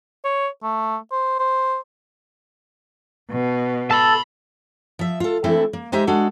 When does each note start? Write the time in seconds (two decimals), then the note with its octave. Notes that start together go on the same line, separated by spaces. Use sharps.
0.24 C#5
0.63 A3
1.12 C5
1.39 C5
3.30 B2
3.91 A4 A5 B5
4.99 F3 E5
5.20 F4 A4
5.44 E3 A3 C4 D4 E4 A4
5.73 A#3
5.92 G#3 D#4 G4 C5 E5
6.07 G#3 D4 F#4 A4